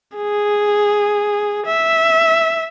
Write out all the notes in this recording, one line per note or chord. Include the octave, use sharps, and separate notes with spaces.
G#4
E5